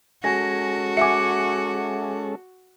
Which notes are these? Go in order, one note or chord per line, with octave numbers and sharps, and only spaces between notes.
G#3 C#4 F#4 A4 G#5 A#6
E5 F#5 G#5 D6 C#7